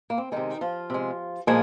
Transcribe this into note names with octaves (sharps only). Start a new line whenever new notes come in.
A#3
C4
C3 D#3 G#3 D#4
F3 F4
C3 G#3
A#2 F3 G#3 A#3 G#4